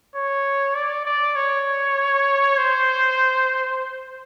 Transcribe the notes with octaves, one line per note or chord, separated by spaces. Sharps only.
C#5
D5
D5
C#5
C5